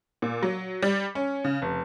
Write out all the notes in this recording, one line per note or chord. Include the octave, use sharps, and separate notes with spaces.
A#2
F#3
G3
C#4
C#3
F1